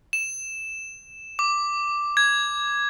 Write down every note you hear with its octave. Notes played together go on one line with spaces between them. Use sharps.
E7
D6
G#6